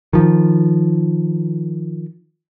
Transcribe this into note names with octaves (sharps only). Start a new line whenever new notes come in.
D#3 F3